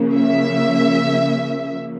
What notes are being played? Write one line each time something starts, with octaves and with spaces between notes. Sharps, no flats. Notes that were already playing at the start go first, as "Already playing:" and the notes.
Already playing: C#3 F3 A#3
E5